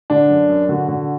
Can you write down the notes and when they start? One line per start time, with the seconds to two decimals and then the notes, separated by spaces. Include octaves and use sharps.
0.10 D3 D4
0.30 F#2
0.49 F#2
0.69 D3 F#4
0.88 D3